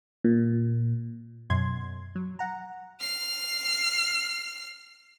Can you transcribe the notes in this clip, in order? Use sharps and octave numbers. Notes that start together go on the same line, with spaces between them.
A#2
F#2 B2 C6 G#6
F#3
F#5 A#5
F6 C7